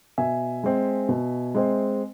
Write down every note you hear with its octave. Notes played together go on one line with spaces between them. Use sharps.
B2 E5 G#5
G#3 C4
B2
G#3 C4